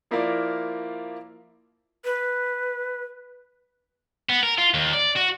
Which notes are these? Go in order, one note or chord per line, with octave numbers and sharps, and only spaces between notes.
F3 A#3 E4 F4 A#4 D5
B4
B3
A#4
F4
D#2
D5
F#4